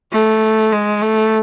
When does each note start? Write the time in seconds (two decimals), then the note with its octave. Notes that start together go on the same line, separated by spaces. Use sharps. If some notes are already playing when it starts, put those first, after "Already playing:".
0.12 A3
0.72 G#3
1.02 A3